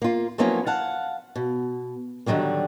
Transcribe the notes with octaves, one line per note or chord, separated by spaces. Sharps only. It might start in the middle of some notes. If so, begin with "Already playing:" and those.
A#3 F4
F3 F#3 A#3 B3 C#4 E4
F5 F#5 A5
B2
D3 D#3 F#3 G3 A#3